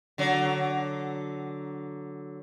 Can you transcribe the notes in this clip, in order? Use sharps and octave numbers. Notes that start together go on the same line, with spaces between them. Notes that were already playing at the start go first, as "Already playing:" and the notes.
D3 F#3